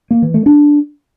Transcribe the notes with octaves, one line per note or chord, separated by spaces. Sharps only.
A#3
E3
A3
D4